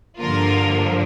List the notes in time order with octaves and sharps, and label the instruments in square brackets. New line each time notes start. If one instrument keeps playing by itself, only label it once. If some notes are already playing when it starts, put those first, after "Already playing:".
[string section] G2 D3 F3 A#3 F4 A#4